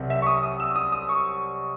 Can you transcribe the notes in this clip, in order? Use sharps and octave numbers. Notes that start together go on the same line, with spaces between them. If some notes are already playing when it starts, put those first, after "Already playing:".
Already playing: C2 C3 F#3 C4
E5
C#6
D#6
D#6
E6
D#6
D#6
C#6